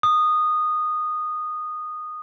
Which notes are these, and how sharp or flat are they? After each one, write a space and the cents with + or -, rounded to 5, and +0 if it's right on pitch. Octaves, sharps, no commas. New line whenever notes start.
D#6 -15